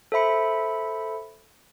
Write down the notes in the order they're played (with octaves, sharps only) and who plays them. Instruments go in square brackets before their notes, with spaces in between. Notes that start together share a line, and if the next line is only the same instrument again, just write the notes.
[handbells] A4 C5 E5 B5 C#7